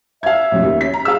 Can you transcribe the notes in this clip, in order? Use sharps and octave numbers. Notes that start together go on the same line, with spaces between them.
E5 F5 G#6
A1 F2 B2
D#2
C#4 B6
A#5
G#4 F5 E6